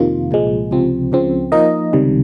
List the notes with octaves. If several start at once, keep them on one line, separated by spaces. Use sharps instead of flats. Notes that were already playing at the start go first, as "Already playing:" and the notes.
Already playing: F2 C3 D#3 A#3 F4
C2 A#2 F3 G#3
C#2 C3 F3 C4
C#2 C#3 F3 C4
F3 A#3 D#4 A#4 D#5
C#2 C3 D#3 G3